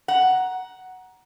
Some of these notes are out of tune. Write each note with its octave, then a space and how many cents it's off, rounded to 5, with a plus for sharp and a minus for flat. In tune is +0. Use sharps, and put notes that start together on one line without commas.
F#5 +5 A#5 +15